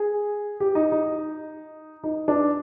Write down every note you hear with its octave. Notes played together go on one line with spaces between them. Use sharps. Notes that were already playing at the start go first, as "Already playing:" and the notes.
Already playing: G#4
G4
D#4
D#4
D#4
D4